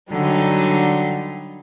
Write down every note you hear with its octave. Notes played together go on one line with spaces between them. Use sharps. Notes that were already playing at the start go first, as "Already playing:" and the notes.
D3 F#3 G3 D#4